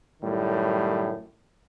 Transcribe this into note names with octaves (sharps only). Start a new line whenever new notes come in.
F#2 A2 D#3 G3